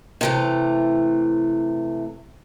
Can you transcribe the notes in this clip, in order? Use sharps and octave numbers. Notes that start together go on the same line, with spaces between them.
C3 E3 A3